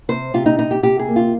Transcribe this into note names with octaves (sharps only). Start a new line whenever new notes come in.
C3 C5
C3 F4
D#4
C3 D#4
G4
C3 G4
G#4
A#3
F4